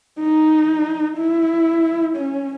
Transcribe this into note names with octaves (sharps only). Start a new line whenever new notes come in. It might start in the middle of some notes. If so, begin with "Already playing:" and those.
D#4
E4
C#4